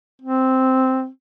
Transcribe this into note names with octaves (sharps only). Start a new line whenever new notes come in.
C4